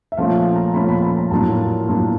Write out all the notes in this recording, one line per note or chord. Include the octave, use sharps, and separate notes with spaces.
E5
A#2 F3 A3 C#4 F4 F5
A#5
A#2 F3 A3 C#4 F4 B5
B5
B5
A#5
A2 F#3 A#3 D4 F4 A5
A2 F#3 A#3 D4 F4